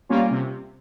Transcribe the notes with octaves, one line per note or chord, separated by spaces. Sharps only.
G3 A#3 C#4 F4
C3